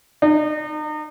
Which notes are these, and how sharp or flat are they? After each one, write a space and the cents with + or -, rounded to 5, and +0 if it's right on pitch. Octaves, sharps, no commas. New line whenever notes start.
D#4 -40